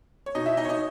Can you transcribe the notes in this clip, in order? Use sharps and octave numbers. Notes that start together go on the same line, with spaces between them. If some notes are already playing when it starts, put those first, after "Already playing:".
C#5
B2 D#4 D#5
E4 E5
D#4 D#5
C#5
D#4 D#5